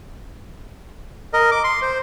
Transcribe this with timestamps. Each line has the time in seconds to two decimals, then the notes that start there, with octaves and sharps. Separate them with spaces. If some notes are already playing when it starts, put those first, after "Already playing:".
1.33 A#4 D#5
1.52 D6
1.64 C6
1.82 C5